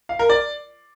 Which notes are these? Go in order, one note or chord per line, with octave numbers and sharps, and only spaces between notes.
F5
A#4
D5